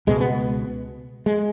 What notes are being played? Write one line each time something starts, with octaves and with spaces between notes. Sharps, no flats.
C#2 B2 G#3
B3
G#3